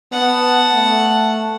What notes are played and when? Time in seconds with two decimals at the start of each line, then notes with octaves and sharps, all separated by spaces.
0.13 B3 F#5 A5
0.73 A3